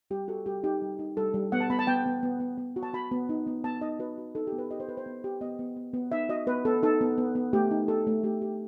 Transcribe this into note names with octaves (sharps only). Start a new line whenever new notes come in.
G3 G4
F#4 A4
G3 G4
D#4 G4
G3
D#4
G3 A4
G3
B3 F#5
A5
B3 B5
A5
B3 G5
B3
B3
B3
B3
F#4
A5
F#4 B5
B3
D#4
B3
B3 A5
D#4 D#5
F#4 B4
F#4
D#4 A4
G4
B3
B4
G4 D#5
C5
B3 B4
C5
B3
G4
B3 D#5
B3
B3
B3
D#4 E5
F#4 D#5
B3 B4
B3 A4
D#4 A4
B3
B3
B3
A3 G4
D#4
G4 A4
A3
A3 G4
G4